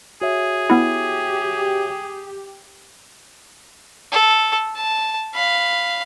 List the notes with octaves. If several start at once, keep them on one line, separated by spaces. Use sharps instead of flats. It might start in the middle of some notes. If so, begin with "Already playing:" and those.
F#4 G#4 C#5 E5
B3 E4 G4
A4
A5
F5 B5